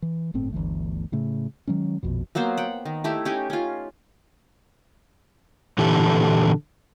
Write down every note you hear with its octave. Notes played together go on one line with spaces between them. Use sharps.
E3
G1 A2 C4
G1 D2 E3 A3
A2 C#3 A3
D#3 F#3 G#3 C#4
A#1 F2 B2
F#3 A#3 B3 C5
F#5 G5
D#3
A3 D#4 E4 G4
C#4 D#4 G4
C#4 F4
A#2 D3 E3 G4 A4